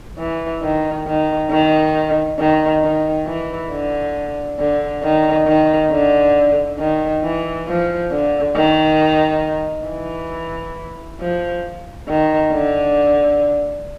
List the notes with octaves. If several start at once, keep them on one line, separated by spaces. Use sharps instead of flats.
E3
D#3
D#3
D#3
D#3
D#3
E3
D3
D3
D#3
D#3
D3
D#3
E3
F3
D3
D#3
E3
F3
D#3
D3